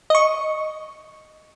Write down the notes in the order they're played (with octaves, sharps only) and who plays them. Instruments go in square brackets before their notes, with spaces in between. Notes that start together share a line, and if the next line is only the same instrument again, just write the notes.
[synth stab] D#5 C#6